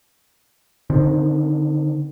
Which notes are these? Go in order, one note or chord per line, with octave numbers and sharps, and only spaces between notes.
D3 D#3 C4